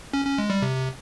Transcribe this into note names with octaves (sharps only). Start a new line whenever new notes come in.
C#4
C#4
G#3
G3
C3